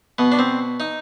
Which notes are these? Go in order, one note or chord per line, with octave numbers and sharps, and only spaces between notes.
B2 B3
D4
C4
D#4